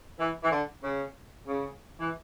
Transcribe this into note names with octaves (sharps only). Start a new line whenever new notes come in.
E3
E3
D3
C#3
C#3
E3